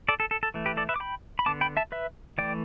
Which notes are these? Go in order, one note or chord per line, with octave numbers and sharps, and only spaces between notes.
A4 D5
A4
A4
A4
E3 A3
G4 B4
A4 D5
B4 E5
D6
G5 B5
B5
D3 B3 A5 D6
G5 B5
E5 A5
B4 E5
E3 A3 D5 G5